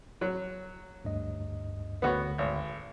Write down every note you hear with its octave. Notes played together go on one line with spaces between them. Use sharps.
F#3
D2 G2 D#5
D2 D3 B3 F#4 C#5
G#1